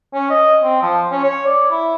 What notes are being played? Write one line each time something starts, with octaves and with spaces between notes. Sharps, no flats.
C#4
D#5
C4
F3
C#4
C#5
D5
E4